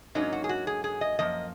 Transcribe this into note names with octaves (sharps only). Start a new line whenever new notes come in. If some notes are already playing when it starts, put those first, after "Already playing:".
G#2 F#3 A#3 C#4 D#4
F#4
G#4
F#4
G#4
G#4
D#5
F#2 F3 A#3 D#5